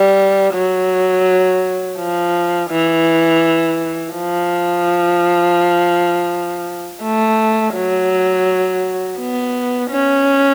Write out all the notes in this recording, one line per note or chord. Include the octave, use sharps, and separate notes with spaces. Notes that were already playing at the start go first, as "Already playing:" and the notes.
Already playing: G3
F#3
F3
E3
F3
A3
F#3
B3
C#4